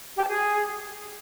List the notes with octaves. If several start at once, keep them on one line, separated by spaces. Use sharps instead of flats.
G4
A5
G#4